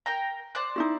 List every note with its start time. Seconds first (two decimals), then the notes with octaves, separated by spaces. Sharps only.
0.06 A#4 G5 A#5
0.55 C5 D5 F#6
0.76 D#4 E4 F#4